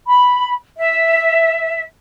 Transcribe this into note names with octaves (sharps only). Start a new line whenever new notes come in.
B5
E5